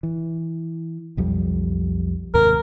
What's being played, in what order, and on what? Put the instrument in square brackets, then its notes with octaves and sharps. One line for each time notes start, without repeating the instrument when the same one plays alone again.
[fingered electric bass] E3
B1 F2 G3
[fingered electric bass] D#2 G#2 C3 [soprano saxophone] A#4